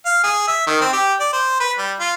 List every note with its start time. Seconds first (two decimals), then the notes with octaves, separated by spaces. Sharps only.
0.06 F5
0.24 G#4
0.48 E5
0.67 D#3
0.81 C4
0.93 G4
1.20 D5
1.33 C5
1.60 B4
1.78 G3
2.00 F4